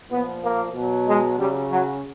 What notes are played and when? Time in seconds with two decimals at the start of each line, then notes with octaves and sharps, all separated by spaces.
0.10 A#2 F3 B3
0.42 A#3
0.74 B2 F#3
1.06 G#3
1.38 C#3 F#3 G3
1.70 F#3